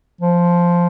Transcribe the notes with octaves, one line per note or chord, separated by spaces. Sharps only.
F3